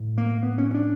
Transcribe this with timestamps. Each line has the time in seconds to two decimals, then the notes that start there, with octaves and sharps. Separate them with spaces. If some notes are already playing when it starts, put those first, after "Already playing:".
Already playing: A2
0.18 A#3
0.43 B3
0.58 C#4
0.71 C#4
0.74 D4